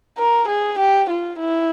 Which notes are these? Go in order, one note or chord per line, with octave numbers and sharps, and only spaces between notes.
A#4
G#4
G4
F4
E4